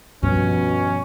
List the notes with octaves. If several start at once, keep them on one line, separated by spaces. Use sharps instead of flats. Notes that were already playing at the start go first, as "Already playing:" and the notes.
G2 B2 F3 C#4